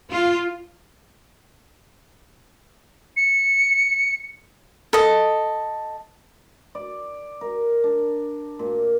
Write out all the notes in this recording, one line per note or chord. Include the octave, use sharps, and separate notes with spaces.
F4
C#7
A4 D#5
D5
A#4
D4
A#2